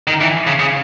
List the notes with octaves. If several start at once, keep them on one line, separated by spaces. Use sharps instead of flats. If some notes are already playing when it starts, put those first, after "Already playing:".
D#3
E3
C#3
C#3